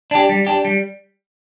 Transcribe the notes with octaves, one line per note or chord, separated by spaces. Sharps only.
D4 G4
G3
D4 G4
G3